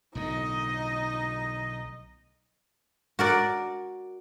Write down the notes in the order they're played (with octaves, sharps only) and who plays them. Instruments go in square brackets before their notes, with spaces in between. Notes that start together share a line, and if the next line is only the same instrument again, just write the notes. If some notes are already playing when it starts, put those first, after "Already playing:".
[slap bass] B1 A2 D3 [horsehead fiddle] D#4 D#5
[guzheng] F#4 A#4 D5